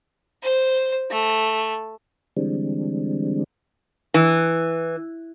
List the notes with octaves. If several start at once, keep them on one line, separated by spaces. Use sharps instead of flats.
C5
A3
D3 E3 G3 G#3 C4 D4
E3